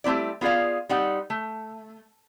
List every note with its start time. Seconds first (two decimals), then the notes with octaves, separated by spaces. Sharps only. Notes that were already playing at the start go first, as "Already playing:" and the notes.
0.04 G3 A3 C4 E4 D5
0.41 B3 F4 G#4 D5 F5
0.89 G3 C4 D#4 F#5
1.30 A3